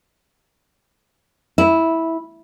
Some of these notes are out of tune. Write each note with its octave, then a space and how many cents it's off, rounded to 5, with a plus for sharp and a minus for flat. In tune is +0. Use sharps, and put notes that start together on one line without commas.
E4 -10